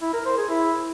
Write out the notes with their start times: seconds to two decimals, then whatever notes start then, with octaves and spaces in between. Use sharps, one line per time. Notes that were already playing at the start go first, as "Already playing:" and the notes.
0.02 E4
0.14 A#4
0.25 C5
0.37 G#4
0.49 E4